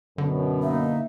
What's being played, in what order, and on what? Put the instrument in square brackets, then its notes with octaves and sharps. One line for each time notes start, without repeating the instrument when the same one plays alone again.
[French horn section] F#2 B2 [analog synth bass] D3
[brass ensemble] A#3 D#4 [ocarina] E5